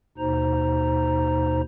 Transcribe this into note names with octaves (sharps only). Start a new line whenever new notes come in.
D#2 B2 D#4 C5 A#5